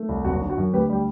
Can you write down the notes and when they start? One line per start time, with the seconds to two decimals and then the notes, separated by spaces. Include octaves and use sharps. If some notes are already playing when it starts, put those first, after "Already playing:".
Already playing: A3
0.09 C2
0.25 F#1 F#4
0.41 D3
0.50 F#4
0.57 F#2
0.73 D2 G4 B4
0.89 G3 G4